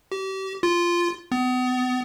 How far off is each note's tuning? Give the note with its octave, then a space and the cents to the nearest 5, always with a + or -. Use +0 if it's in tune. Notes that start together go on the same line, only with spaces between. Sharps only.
G4 -35
F4 -10
B3 +35